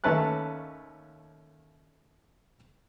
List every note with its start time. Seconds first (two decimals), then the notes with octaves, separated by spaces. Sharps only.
0.04 D#2 A3 C#4 B4 A5 F#6